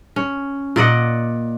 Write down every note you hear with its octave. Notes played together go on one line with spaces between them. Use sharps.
C#4
A#2 D5 D#5 F#5